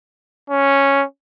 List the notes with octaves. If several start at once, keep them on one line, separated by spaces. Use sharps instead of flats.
C#4